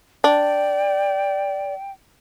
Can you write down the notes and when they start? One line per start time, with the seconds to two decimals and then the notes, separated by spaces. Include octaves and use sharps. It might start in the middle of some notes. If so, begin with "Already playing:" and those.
0.24 D4 D5 G5